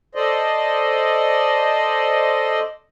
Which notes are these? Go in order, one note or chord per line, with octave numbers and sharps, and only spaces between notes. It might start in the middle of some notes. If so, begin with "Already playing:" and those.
A4 C5 D5 D#5